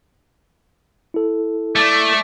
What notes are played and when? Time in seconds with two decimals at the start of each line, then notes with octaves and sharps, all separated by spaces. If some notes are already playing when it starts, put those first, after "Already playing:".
1.14 E4 A4
1.76 A3 D5